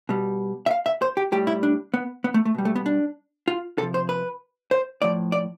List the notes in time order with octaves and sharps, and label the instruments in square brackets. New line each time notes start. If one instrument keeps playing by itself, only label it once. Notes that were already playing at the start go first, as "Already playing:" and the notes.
[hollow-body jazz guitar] B2 G3
E5
F5
E5
C5
G4
A2 G3 G4
E4
D4
B3
B3
A3
A3
B2 G3
A3
B3
D4
F4
C3 F3 A4
C5
B4
C5
A2 F3 D5
D5